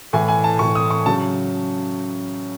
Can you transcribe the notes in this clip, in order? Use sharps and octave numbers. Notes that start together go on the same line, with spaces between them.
A2 E3 G#5
G#5
A5
A2 E3 C#6
D#6
C#6
C#3 F#3 A5